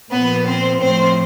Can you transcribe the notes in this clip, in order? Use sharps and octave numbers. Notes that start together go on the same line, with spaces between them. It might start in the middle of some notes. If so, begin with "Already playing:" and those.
A#2 F3 B3 B4
C4 C5
A2 F3 C4 C5